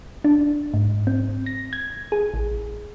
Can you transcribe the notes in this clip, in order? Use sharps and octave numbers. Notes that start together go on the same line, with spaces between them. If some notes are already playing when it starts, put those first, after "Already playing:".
D4
G#2
C4
A#6
G#6
G#4
A1